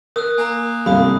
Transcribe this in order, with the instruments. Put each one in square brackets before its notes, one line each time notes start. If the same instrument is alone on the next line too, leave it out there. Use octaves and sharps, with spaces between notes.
[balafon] A#4 [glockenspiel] D#6 E6 F#6
[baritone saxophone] A#3 [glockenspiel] G#5 A#5
[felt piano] G1 C2 C3 [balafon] F5 [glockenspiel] B5 D#6